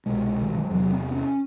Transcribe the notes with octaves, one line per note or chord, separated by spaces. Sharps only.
C2 B2 G#3
D3
D#3
E3
F3
E2 C3 F#3
C4
C#4